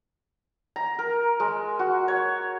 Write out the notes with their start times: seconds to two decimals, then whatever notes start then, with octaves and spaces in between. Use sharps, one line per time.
0.76 A#5
0.99 A#4
1.40 G#3
1.79 F#4
2.08 C#5